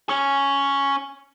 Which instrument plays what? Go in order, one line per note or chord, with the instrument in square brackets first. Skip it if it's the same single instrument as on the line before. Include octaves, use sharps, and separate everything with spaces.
[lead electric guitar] C#4 C#5